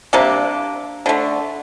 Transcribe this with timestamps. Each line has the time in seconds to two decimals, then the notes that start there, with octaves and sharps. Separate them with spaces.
0.13 C3 G3 A#3 D4
1.06 D3 A3